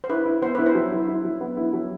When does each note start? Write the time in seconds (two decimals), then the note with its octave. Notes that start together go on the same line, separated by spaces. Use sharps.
0.04 C5
0.09 E4 B4
0.25 E4
0.42 B3 C5
0.55 E4 B4
0.66 C5
0.75 F#3
0.91 E4
1.08 E4
1.24 F#3
1.41 B3
1.57 E4
1.73 F#3